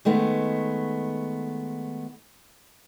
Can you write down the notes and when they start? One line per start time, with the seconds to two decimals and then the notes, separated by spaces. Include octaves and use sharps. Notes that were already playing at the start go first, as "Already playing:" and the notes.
0.05 D#3 G#3 A3 B3